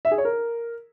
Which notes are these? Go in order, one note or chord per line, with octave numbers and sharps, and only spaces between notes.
E5
G#4
C#5
A#4